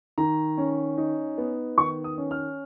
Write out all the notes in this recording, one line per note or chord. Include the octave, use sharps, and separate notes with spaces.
D#3 A#5
C#4
D#4
B3
D#3 C#6
D#6
C#4
F6